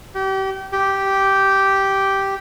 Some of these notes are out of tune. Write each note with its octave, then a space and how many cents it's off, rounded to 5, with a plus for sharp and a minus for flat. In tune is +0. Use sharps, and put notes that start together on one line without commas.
G4 -30
G4 -5